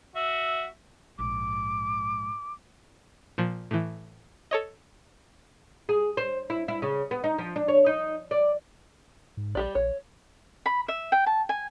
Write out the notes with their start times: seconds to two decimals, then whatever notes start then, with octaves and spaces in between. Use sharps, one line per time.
0.16 F#4 E5
1.19 A#1 G#2 D6
3.38 A#2 F3
3.71 A2 E3
4.51 A4 C#5 D#5
5.89 G#4
6.17 C5
6.50 E4
6.68 E4
6.82 C#3
7.11 B3
7.24 D#4
7.38 F3
7.56 D4
7.68 C#5
7.86 D#4
8.31 D5
9.37 G#2
9.55 A#1 G3 G4 D5
9.75 A#1 C#5
10.66 B5
10.88 E5
11.12 G5
11.26 A5
11.49 G#5